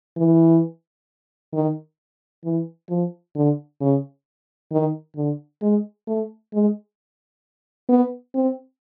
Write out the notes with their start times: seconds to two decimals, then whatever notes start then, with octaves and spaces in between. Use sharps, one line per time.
0.17 E3
1.54 D#3
2.44 E3
2.90 F3
3.36 D3
3.81 C#3
4.72 D#3
5.16 D3
5.62 G#3
6.08 A3
6.54 G#3
7.89 B3
8.35 C4